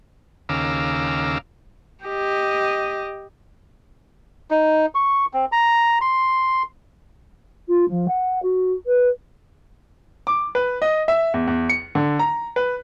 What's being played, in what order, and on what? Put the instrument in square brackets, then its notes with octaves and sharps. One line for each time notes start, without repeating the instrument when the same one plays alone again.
[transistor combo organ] D#2 C#3 F5 A#5 D6 E6
[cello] G4 D#5
[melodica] D#4
C#6
C4
A#5
C6
[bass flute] F4
F3
F#5
F#4
B4
[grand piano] D6
B4
D#5
E5
E2
E2
C#7
D3
A#5
B4